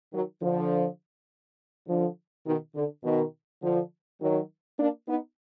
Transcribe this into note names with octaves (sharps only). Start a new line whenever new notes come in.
D#3 F#3
D3 F3
D3 F3
B2 D#3
D3
B2 D#3
D3 F3
D#3 F#3
A#3 D4
B3 D#4